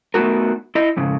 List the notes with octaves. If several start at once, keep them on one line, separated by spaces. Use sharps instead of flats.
A3 B3 D#4 F#4 A#4
E4 D#5
F2 G#2 C#3